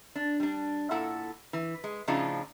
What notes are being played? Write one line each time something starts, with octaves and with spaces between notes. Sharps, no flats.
D4
G3 D4
A#2 E4 A4 F#5
E3
G#3
A2 C#3 F3 D4 D#4 F4